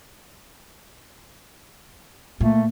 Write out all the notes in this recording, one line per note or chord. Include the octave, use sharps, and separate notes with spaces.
A#2 A3